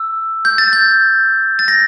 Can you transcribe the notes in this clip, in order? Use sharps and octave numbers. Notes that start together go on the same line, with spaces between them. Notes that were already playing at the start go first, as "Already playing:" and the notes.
Already playing: E6
G6
A6
G6
A6
A#6